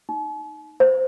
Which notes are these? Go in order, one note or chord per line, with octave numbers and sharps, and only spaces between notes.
D#4
C5